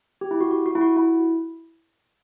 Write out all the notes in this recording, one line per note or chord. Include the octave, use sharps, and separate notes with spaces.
G4
E4
F#4
F#4
F#4
E4
F#4
E4